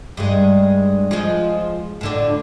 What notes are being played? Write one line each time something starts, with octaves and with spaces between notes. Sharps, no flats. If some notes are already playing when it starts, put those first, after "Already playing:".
G2 G3 G#3
F3 G#3
A2 D3 D4